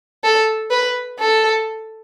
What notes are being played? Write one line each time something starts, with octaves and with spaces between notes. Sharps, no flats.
A4
B4
A4